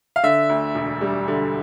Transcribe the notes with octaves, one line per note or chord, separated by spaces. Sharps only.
F5
D3 E5
D2
E1
G3
D3